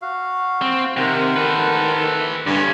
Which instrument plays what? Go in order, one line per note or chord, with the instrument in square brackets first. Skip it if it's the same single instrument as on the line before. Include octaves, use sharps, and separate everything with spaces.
[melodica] F#4 F5
[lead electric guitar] C4
[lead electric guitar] C3 [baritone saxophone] D#3 [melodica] A#4 C5 F#5
[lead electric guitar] A4 B4
[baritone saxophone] G2 [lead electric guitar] D3 C#4